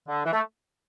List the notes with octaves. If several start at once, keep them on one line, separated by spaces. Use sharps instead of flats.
D3
E3
A3